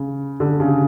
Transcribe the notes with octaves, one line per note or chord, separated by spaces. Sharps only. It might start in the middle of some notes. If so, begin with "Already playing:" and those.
Already playing: C#3
D3
C#3